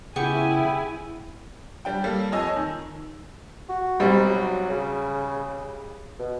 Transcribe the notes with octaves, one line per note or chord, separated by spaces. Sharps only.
C#3 B3 E4 G4 G#4 G#5 C#6
G3 D4 G5
G3 A#3 A4
F2 C#5 D#5 G#5 E6
D#3
F#4
B1 G3 C4
F#3
C#3
B2